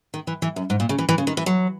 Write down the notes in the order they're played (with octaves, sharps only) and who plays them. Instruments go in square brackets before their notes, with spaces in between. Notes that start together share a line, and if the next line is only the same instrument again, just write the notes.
[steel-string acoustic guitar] D#3
E3
E3
F#2
G#2
A#2
C#3
E3
E3
C#3
D#3
E3
F#3